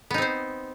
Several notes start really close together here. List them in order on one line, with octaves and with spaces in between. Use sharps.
B3 D#4 C4 C5